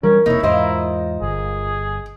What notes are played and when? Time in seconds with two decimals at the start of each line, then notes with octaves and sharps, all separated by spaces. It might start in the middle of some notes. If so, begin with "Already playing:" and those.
0.03 E3 G3 C#4 D4 A#4
0.26 E1 C3 A#3 D#4 E4 C#5
0.43 E2 G#2 F4 A#4 C5 D#5
1.22 G1 G#4